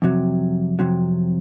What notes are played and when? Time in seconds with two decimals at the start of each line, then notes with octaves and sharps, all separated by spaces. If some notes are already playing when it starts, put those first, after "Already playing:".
0.02 F2 C3 F#3
0.79 F2 C3 F#3